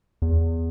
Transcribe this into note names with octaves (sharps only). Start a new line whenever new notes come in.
E2